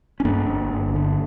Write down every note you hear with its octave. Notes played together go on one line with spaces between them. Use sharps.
C#4
G2 A#3 D4
G1
G1
D3